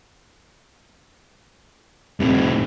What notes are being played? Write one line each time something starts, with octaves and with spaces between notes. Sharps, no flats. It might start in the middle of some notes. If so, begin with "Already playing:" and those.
F1 F2 A2 C3 G3